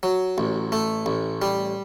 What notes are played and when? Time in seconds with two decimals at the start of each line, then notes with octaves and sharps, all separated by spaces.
0.03 F#3
0.38 A1
0.72 A3
1.06 A1
1.42 G3